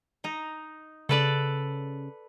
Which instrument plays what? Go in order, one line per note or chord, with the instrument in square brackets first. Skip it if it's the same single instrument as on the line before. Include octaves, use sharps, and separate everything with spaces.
[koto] D#4 A#5
[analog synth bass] C#3 [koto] A4 B4 D5